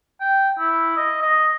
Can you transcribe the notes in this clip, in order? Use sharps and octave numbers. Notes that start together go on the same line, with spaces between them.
G5
E4
D#5
D#5